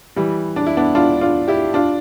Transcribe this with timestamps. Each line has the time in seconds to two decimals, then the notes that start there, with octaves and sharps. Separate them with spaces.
0.16 E3 G3
0.56 D4
0.67 E4
0.77 B3 D4
0.95 D4 F4
1.21 D4 F4
1.48 E4 G4
1.74 D4 F4